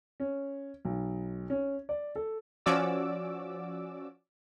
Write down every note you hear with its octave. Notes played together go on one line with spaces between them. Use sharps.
C#4
B1
C#4
D5
A4
F3 C#4 F#4 D5 D6 E6